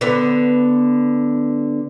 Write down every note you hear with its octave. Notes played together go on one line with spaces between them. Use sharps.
D3 B3 B4